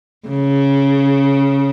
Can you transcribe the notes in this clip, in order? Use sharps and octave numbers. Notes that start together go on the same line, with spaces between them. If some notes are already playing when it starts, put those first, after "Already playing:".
C#3